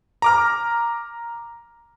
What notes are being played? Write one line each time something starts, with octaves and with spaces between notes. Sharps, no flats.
A#5 D6 F6